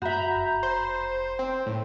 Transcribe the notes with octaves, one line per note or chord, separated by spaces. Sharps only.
F#2 F#4 E5 A#5 B5 G6
F1
C5
C4 G5
A2